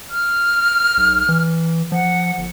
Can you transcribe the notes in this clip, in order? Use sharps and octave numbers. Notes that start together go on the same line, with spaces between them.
F6
B1
E3
F3 F#5
G1